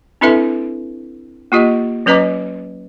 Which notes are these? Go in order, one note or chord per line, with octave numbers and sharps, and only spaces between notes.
C4 D4 E4 A4 B4 E5
A#3 F4 G4 D#5
F#3 C#4 B4 D#5 A#5 D6